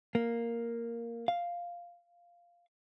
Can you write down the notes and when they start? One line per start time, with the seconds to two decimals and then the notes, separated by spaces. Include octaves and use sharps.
0.15 A#3
1.28 F5